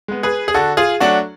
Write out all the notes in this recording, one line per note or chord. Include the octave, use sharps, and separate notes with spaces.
G#3 B3
G#4 B4
G#4
D3 F#4 A4
F4 G#4
F#3 A3 D4 F#4